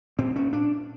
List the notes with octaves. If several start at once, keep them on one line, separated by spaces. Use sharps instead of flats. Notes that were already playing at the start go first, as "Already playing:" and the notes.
A#2 C4
C#4
D4